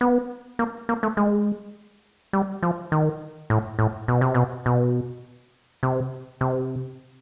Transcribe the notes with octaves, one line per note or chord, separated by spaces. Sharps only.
B3
A#3
A#3
A3
G#3
G3
F3
D#3
A2
A2
B2
C3
B2
B2
C3
C3